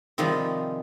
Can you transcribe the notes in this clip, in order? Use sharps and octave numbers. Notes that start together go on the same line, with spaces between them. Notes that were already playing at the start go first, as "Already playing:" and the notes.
C3 D#3 F3 G3 G#3 D#4